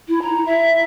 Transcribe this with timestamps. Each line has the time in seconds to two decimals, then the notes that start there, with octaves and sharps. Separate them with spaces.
0.08 E4
0.21 A#5
0.45 E5